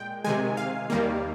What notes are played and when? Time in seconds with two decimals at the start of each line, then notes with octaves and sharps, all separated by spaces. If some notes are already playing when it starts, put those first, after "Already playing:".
Already playing: A#2 G#3 G5
0.24 C3 D#3 G#3 G#5
0.57 F5
0.90 D#2 D#3 G3 A#3